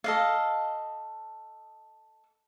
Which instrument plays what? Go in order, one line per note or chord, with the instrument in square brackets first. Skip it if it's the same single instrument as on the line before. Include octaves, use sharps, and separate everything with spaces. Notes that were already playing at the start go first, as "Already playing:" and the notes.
[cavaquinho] A4 D#5 F5